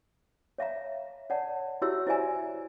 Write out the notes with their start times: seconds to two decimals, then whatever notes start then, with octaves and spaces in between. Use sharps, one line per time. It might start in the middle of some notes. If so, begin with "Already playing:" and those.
0.58 C#5 E5 F5 A#5
1.30 C#5 D5 F#5 A5
1.82 E4 F#4 G4 C#5 E5 E6
2.07 E4 C5 D5 E5 G#5 A#5